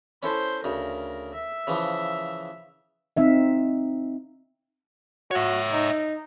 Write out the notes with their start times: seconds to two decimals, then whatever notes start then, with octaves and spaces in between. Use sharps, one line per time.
0.23 C#4 E4 A4 C5
0.64 D2 C#3 A#4
1.34 E5
1.67 C#3 E3 F3
3.17 C4 D#4 E5 F5
5.31 F#4 C#5 E5
5.72 D#4